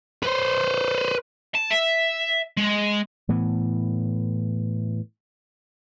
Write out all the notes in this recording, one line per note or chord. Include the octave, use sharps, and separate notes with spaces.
B4 C5
A5
E5
G#3
A2 E3 B3